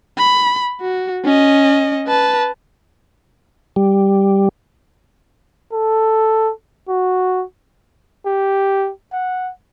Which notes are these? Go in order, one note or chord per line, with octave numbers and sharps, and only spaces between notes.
B5
F#4
C#4 D#5
B4 A5
G3
A4
F#4
G4
F#5